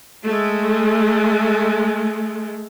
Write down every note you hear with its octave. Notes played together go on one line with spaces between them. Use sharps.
G#3 A3